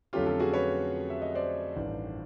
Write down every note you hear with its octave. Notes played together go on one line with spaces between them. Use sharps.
F2 D3 F#3 A3 C#4 F4 G4
G4 A4
F#4 G#4
B4 C#5
E5
D#5
C5 D5
A1 G2 D#3